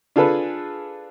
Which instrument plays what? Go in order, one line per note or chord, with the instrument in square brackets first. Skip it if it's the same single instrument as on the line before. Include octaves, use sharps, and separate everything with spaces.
[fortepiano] D4 F4 G#4 A4 B4